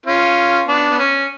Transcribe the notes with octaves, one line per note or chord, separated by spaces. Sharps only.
C#4 F4
B3 D4
B3
C#4